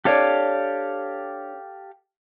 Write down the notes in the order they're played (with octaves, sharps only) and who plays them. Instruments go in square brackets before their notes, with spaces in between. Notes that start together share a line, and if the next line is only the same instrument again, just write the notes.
[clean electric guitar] D4 C#5 D5 [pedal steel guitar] G4 A4 F5